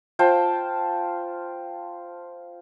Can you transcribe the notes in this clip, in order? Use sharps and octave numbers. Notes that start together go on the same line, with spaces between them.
F4 C5 G5 A5